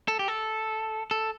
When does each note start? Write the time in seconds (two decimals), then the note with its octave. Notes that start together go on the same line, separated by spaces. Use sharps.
0.08 A4
0.19 G4
0.28 A4
1.11 A4